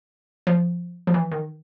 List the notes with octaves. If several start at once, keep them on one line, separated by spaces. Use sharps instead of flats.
F3
F3
E3
D#3